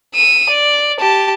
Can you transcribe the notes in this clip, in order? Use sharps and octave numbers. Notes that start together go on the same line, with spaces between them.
E6 D#7
D5
G4 A5